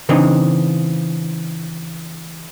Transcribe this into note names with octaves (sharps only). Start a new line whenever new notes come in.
C#3 E3 C4 D4 D#4